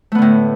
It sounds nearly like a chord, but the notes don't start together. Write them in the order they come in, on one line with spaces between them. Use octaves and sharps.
A3 B3 D3 A2